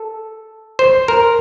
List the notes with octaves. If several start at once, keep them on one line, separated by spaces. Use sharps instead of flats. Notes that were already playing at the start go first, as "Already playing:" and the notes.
Already playing: A4
C5
A#4